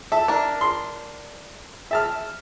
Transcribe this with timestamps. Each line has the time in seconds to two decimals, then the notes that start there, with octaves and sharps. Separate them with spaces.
0.12 A4 E5
0.28 D4 A#4
0.61 C6
1.91 E5 A5 F6